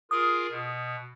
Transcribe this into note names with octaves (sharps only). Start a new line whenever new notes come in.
F4 G#4 A#4 D#6
B2